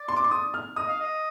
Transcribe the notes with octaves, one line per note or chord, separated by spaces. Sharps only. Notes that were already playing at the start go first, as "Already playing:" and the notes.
Already playing: D5
C6
D6
C6
D#6
F6
D#5 D#6
F5
D#5